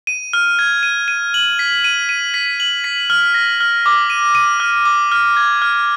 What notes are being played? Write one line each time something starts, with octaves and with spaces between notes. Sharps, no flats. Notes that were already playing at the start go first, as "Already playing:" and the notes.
D#7
F6
G#6
D#7
D#7
F#7
B6
D#7
D#7
B6
F#7
B6
F6
A#6
F6
D6
D#7
D#7
F6
D6
F6
G#6
F6